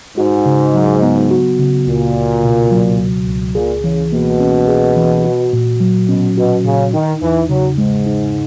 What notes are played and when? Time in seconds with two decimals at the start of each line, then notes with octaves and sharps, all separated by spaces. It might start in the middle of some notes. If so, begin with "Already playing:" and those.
0.18 G#2 F#4
0.46 C#3
0.74 F#3
1.02 B3
1.31 F#4
1.59 C#3
1.87 C#2 A#2
2.15 C#2
2.43 B2
2.71 F#3
2.99 C#2
3.27 C#2
3.55 A#2 G#4
3.83 C#3 E3
4.12 B2 A#3
4.40 C#4
4.68 G#4
4.97 E3
5.25 F#4
5.53 A#2
5.80 F#3
6.08 B2 C#4
6.37 B2 F#4
6.65 A#2 C#3
6.93 D#3 D#4
7.22 E2 E3
7.50 C#3 F#3
7.78 G#2 G#3
8.06 D#4